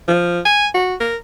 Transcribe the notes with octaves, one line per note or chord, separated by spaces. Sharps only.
F3
G#5
F#4
A#4